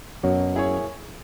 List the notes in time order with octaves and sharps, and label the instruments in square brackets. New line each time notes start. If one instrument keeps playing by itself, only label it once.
[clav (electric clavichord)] F#2 F#3 [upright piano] B2
[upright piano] A#3 E4 G#4 C#5